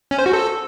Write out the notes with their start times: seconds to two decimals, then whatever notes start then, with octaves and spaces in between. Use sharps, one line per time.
0.11 C#4
0.19 C5
0.26 F#4
0.33 A4